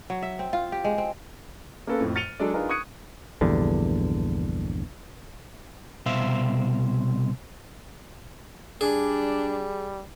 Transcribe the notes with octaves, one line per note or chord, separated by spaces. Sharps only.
F#3
E5
C4
F4
G4
G#3
C4
A#3 B3 C#4 A4 B4
F2 A2
F6 A6 C#7 D#7 F7 G7
F#3 G#3 D4 A4 D5
D4 D#4 F4 G#4 A#4 B4
C#6 D#6 F#6 G#6 C#7 D#7
A#1 E2 G2 D3
C2 B2 C5 E5 F5
G3 D4 G#4